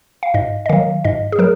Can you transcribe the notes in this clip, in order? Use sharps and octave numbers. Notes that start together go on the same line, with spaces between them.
F5
G#2 D#5
D#5
D#3 F#3 F5
G#2 D#5
G#4
F#3 A#4